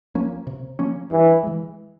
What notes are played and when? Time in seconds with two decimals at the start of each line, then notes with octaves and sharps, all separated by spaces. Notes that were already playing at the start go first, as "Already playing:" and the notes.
0.15 F3 A#3 C#4
0.47 C3
0.79 F3 A#3 C#4
1.11 G2 E3
1.43 E3 G#3